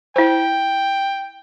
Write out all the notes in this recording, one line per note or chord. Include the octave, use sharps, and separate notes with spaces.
E4 C5 G5